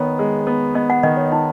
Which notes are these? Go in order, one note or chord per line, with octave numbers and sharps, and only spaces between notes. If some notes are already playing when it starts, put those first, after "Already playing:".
Already playing: D#3 B3 C#5
G#3
B3
B3 D#5
F#5
D#3 D#5
C#5
D#4